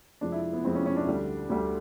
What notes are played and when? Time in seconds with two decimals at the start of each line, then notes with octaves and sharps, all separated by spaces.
0.21 F2 C3 F3 G#3 D4
0.32 E4
0.53 B3
0.64 F2 C3 F3 G#3 C4
0.75 C#4
0.86 C#4
0.97 D4
1.07 D2 D3 G3
1.49 D2 D3 G3